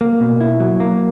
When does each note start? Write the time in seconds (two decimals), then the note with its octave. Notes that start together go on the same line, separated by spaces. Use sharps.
0.01 A#3
0.20 B2
0.40 E4
0.60 F#3
0.80 A#3